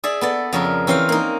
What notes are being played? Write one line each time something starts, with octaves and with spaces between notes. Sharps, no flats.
G#4 D5 E5
B3 A4 D5
F2 C#3 A#4
E3 C4 C#4 C5 F5
A#3 D#4